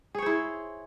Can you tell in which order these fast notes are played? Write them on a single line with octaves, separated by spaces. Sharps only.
G#4 C#5 C5 E4